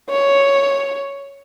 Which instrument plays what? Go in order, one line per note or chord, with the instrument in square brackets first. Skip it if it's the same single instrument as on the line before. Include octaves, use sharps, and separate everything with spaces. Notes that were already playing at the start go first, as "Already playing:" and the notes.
[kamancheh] C#5